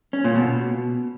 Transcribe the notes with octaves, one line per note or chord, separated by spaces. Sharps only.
C#4
A#2
B2